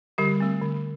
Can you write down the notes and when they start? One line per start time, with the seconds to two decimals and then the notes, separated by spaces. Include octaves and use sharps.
0.18 D3 G3 G4
0.40 A3 C4
0.62 D3